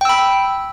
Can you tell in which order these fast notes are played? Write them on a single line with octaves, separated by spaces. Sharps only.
G5 E6 B5